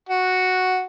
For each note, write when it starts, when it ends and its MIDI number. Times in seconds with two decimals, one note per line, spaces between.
0.09 0.83 66